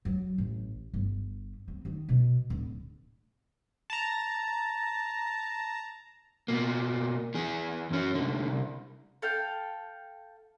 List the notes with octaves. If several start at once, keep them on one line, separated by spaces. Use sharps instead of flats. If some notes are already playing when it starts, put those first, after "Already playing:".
F#3
A1
G1
C4
D#3
B2
D1
A5 A#5
B2 A#3
E3 G#4
F#2 C#4
C2 D3
C2
A4 F5 G5